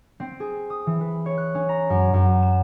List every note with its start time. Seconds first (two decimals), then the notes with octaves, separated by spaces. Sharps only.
0.20 C4
0.40 G#4
0.70 D#6
0.87 E3
1.01 B4
1.26 C#5
1.38 F#6
1.55 C#4
1.69 A#5
1.90 F#2
2.13 F#2
2.43 E7